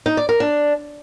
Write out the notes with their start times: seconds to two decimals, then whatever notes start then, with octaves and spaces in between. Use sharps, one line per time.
0.06 D#4
0.17 D5
0.29 A#4
0.40 D4